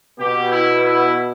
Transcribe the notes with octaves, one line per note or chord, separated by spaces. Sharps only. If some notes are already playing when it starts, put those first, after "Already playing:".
B2 B3 G4
E4
E4